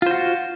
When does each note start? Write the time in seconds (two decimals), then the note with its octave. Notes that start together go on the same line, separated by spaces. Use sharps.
0.02 F4
0.06 C5
0.11 F#4